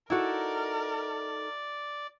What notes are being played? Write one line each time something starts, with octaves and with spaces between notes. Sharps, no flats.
D#4 E4 F#4 A4 A#4 D5